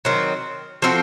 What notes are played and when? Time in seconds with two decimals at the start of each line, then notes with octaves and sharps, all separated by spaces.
0.05 D#3 F#3 C4
0.82 F3 C4 F#4 A4